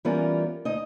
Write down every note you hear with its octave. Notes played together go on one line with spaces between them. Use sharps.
E3 G3 B3 C#4 F4 A#4
D2 D#4 D#5